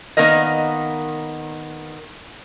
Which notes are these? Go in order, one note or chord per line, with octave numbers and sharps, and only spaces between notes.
D#3 A#3 B3 A#4 D#5